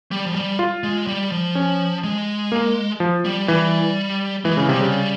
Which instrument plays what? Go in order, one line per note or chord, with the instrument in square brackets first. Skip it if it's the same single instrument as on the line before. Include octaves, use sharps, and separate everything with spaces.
[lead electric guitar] G3
F3
G3
[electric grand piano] F4
[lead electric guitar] G#3
G3
F3
[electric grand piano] C#4
[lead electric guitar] G#3
[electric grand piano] A#3
F3
[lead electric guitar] G3
[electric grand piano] E3 [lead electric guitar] G3
[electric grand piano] E3 [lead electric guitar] G#3
[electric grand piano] C#3
[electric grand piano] C3 [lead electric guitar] G3
[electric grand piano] C#3